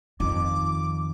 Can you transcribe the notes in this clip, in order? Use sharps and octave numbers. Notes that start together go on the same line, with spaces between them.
F2 D#3 D6